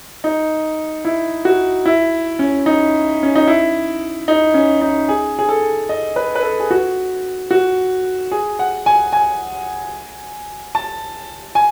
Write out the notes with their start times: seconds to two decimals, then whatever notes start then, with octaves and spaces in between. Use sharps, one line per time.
0.24 D#4
1.05 E4
1.45 F#4
1.86 E4
2.39 C#4
2.66 D#4
3.23 C#4
3.35 D#4
3.48 E4
4.28 D#4
4.54 C#4
4.81 D#4
5.09 G#4
5.39 G#4
5.49 A4
5.89 D#5
6.16 B4
6.35 B4
6.43 A4
6.60 G#4
6.71 F#4
7.51 F#4
8.32 G#4
8.59 F#5
8.86 G#5
9.13 G#5
10.75 A5
11.55 G#5